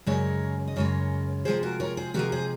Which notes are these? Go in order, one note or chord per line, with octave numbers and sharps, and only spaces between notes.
F#2 C#3 G#3 A#4 C#5
D#5
F#2 C#3 G#3 A#4 C#5
C3 F3 G#3 G#4 C5
F#4 A#4
A#4 C#5
G#4 C5
C3 F3 G#3 F#4 A#4
G#4 C5